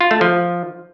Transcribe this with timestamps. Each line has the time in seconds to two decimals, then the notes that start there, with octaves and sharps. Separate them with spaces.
0.01 F4
0.11 A3
0.21 F3